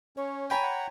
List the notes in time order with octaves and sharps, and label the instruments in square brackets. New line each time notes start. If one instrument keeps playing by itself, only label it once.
[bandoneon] C#4 [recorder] C#5
[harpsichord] C#5 G5 [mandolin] G#5 B5 [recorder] A#5
[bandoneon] F#5